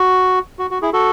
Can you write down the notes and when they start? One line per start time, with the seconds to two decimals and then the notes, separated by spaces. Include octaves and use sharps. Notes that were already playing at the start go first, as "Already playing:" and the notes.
Already playing: F#4
0.59 F#4
0.71 F#4
0.82 E4 G#4
0.93 F#4 A4